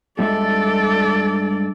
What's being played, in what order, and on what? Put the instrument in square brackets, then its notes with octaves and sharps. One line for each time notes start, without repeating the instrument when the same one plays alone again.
[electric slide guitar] G2 G#3 E5 [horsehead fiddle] A4 D5